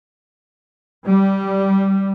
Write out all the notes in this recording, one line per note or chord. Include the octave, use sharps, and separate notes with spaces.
G3